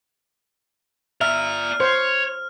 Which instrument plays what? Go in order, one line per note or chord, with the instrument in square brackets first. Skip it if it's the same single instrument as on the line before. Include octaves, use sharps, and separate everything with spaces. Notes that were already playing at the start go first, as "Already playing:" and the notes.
[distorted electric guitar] D5 A#5 [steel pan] E5 [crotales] F6
[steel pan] C5 [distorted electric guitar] C#5